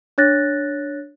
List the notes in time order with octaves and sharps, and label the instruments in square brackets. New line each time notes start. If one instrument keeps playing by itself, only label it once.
[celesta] D4 C#5 F#6 A6 A#6